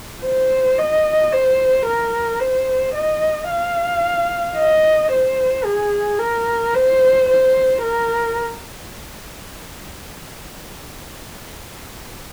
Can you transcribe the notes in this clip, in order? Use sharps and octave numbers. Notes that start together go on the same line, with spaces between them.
C5
D#5
C5
A#4
C5
D#5
F5
D#5
C5
G#4
A#4
C5
C5
A#4